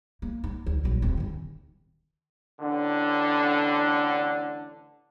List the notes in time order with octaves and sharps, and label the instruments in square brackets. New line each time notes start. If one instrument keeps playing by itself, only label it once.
[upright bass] A#3
D#4
D2
A#1 F#3
D1 C4
D#3 C#4
[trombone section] A1 D3